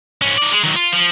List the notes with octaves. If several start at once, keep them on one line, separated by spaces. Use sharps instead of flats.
G#2 C#4
D#4 D5
G#3
D#3 F#3
F4
F3